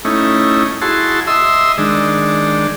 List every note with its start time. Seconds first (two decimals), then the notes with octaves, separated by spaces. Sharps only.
0.05 A3 C#4 D#4 E4
0.81 E4 F#4 G#4 A5 C6
1.27 D#5 E5 C6 E6
1.78 D#3 G#3 D4